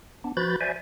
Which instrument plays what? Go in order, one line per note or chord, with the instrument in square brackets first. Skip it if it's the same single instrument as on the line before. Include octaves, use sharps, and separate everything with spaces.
[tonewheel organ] B3 D4
F3 F#4 B4 B5 G6 A6
C5 D5 E5 G#5